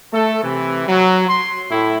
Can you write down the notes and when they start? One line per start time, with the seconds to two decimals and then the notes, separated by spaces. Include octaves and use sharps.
0.12 A3 A4
0.43 C3 E3
0.87 F#3
1.28 C6
1.70 A2 E4